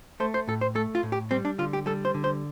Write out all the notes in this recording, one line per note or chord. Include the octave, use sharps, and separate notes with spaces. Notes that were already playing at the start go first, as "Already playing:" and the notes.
A3 C5
C5
A2 A4
C5
A3 A4
F4
A2
G4
G3 C4
D4
D3 F4
G4
G3 A4
C5
D3
C5